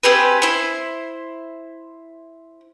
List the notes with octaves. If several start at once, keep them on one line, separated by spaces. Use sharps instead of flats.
C4 G4 G#4 B4
E4 C5